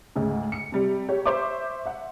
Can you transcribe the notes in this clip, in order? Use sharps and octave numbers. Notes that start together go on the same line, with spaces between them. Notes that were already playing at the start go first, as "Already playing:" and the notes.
D2 G#2 C#3
C#7
C3 G3
G4 C#5
C5 E5 C#6 D6
E5 F#5